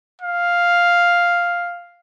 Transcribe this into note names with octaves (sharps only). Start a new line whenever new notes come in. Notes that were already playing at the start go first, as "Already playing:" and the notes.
F5